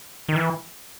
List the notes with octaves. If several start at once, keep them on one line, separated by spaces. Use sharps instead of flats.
D#3
E3